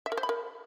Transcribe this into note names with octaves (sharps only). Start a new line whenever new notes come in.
E5
A#4
C5
B5
A#4